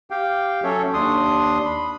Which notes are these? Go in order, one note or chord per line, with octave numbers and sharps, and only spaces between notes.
G4 F5 G5
F#3 C#4 A4 C#5 E5
D#2 D4 C6 D#6
B5